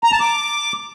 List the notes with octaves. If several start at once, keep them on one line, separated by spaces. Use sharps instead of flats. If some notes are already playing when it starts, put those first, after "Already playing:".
A#5
A5
D6